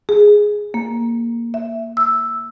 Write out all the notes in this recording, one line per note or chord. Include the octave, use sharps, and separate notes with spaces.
G#4
A#3
E5
E6